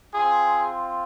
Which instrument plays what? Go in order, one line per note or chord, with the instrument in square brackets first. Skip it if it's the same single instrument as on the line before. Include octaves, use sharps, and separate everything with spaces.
[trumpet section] C4 F4 G#4